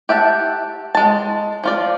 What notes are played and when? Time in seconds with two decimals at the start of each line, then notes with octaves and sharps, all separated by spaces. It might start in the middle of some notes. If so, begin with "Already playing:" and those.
0.09 G4 E5 F#5 A5
0.95 G#3 A5
1.64 F3 F4 D5